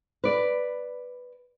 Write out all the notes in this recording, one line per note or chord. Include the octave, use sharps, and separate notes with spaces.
B4 D5